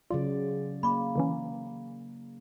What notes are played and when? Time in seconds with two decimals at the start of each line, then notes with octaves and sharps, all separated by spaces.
0.11 C#3 F#3 F4 D5
0.83 A#3 B5 D6
1.16 D3 E3 C#4